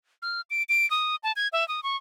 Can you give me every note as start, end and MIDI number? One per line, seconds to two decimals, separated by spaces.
0.22 0.41 89
0.50 0.63 98
0.69 0.89 98
0.91 1.16 87
1.23 1.32 81
1.36 1.48 92
1.53 1.66 76
1.68 1.83 87
1.83 1.96 85